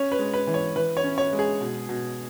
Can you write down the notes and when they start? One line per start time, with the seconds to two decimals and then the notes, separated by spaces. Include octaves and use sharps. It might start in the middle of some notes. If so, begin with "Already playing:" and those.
Already playing: C#4 C#5
0.12 B4
0.19 G#3
0.34 B4
0.47 E3
0.54 C#5
0.76 E3 B4
0.97 C#5
1.04 C#4
1.18 C#5
1.33 G#3
1.39 G#4
1.60 B2
1.89 B2